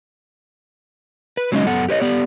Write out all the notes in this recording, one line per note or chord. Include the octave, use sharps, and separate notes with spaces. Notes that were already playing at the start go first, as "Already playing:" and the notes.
B4
F#3 G#3 C#4 D#4 D#5
F#2 B3 A4 F#5
G4 B4 C#5 D#5
B3 G4 D5